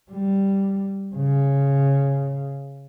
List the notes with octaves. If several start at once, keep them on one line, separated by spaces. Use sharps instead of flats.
G3
C#3